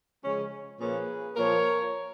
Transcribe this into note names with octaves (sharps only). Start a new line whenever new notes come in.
C#3 F3 G#3 C#4
A#2 F3 A#3 C#4 G#4 B4
A#2 F3 A#3 A#4 C#5